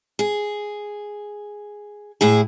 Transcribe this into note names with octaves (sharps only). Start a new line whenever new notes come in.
G#4
A2 E4 G#4